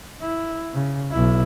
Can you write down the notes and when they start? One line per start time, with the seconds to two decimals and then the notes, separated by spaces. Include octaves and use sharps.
0.21 E4
0.73 C#3
1.12 B1 E4